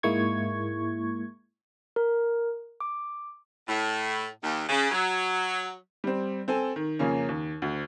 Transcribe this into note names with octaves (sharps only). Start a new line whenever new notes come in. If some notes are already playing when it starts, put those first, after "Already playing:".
G#2 G#3 A#3 E4 C#6 G#6
A#4
D6
A2
D#2
C#3
F#3
G3 C4
C4 A4 G#5
D#3
F2 C#3 A#3 C#4
D#2
D2